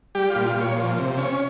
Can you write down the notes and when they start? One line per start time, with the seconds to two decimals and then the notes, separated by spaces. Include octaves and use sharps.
0.15 G3 G4
0.30 F4
0.35 A#2
0.46 F4
0.56 A#2
0.61 C#5
0.76 F3
0.98 C3
1.18 C#4